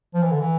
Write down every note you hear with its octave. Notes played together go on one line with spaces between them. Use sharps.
F3
E3
D3
E3